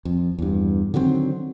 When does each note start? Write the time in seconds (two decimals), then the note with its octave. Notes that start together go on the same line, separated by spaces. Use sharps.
0.05 F2
0.39 E2 G2
0.94 D3 D#3 F#3 C4